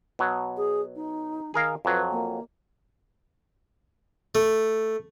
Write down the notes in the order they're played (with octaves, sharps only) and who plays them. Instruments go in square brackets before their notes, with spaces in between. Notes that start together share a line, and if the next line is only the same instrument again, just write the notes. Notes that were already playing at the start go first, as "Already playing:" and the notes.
[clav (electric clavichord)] B2 F#3
[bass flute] G#4
D#4
[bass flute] D#3 [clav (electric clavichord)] G#4 A#4 F5
[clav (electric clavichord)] F2 F#3 [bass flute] B4
[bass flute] A#3
[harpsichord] A3